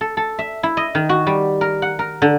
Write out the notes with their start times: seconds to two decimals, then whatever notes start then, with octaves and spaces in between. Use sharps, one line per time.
0.01 A4
0.17 A4
0.39 E5
0.63 E4
0.77 D#5
0.95 D#3
1.09 F#4
1.27 G3
1.61 A#4
1.82 F#5
1.99 A#4
2.22 D3